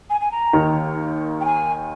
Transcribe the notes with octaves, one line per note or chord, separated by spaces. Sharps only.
G#5
G#5
A#5
D#2 D#3
G5
G#5